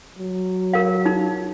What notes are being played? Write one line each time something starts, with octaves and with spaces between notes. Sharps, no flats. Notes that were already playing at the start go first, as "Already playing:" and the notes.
F#3
A#4 F5
D#4